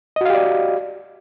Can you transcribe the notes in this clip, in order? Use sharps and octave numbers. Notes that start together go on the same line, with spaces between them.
F#4 G4 D5 D#5 F5